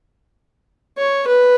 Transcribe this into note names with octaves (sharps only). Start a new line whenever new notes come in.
C#5
B4